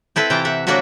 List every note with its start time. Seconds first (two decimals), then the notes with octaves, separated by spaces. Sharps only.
0.16 C4 E4 A4 B4
0.30 C3 E3 F4 G5 A5 A#5
0.45 E5 F#5
0.67 E3 F#3 A#3 D4 F#4 E5